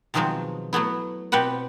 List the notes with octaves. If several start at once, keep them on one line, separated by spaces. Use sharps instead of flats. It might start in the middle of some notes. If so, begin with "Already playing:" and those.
B2 D#3 F3 F#3 G#3 C4
F#3 A3 B3 E4
B2 C4 G4 B4 F#5